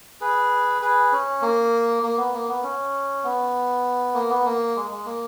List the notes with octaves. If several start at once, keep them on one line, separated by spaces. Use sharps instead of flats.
G#4 B4
G#4 B4
C#4
A#3
A#3
B3
A#3
B3
C#4
B3
A#3
B3
A#3
G#3
G#3
A#3